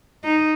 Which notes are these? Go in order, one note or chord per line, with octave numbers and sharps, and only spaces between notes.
D#4